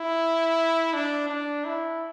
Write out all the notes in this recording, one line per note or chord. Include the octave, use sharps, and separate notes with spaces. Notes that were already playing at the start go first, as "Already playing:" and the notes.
Already playing: E4
D4
D4
E4